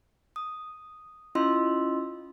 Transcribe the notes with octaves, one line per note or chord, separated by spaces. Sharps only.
D#6
C#4 E4 F4 D#5 C6 E6